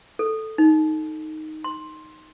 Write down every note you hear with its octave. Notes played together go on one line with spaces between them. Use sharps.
A4
D#4
C6